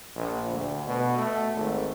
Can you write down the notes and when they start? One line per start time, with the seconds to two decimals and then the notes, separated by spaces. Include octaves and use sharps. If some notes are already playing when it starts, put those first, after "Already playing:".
0.16 A#1
0.51 D2
0.87 B2
1.18 A3
1.56 G#1